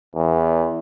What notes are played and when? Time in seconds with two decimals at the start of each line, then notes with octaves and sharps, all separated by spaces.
0.15 E2